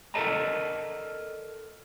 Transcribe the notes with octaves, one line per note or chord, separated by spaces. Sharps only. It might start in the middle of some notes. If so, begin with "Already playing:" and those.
A4 A#4 D5 D#5 A5 A#5